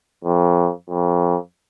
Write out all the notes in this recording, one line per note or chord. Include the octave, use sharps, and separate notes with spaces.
F2
F2